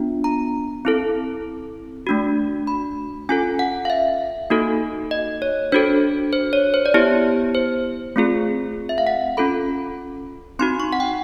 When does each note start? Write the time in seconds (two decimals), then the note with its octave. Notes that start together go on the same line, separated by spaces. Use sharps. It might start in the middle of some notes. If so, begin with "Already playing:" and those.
Already playing: B3 D4 F4
0.24 A#5
0.85 C4 E4 A4
2.07 A3 D4 F#4
2.67 B5
3.29 C#4 F4 A4 G#5
3.59 F#5
3.85 F5
3.90 E5
4.50 A#3 D#4 F#4 A4
5.11 D#5
5.42 C#5
5.72 D4 F#4 A4 C5
6.33 C5
6.53 C#5
6.74 C5
6.86 D5
6.94 B3 E4 G4 C#5
7.55 C5
8.16 A3 C4 F4 G#4
8.89 E5
8.98 F5
9.07 F#5
9.37 C#4 F4 A4 B5
10.59 C4 D#4 F#4 C6
10.80 C#6
10.93 F#5
11.00 G5